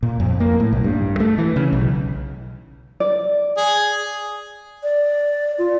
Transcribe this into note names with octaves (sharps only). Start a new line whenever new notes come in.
A#2
F2
A#3
A2
B1
G2
A3
E3
C#3
B1
D5
G#4
D5
F4